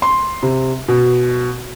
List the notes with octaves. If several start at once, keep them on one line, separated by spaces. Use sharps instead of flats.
C6
C3
B2